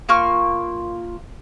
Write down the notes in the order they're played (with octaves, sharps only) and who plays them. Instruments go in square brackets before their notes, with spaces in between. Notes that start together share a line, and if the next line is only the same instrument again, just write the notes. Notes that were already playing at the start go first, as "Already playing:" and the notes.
[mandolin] A#3 F4 C#6 F6